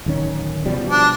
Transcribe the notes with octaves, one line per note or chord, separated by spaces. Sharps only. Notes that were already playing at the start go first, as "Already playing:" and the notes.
D1 D#3 C#4
B2 F3 G3
D4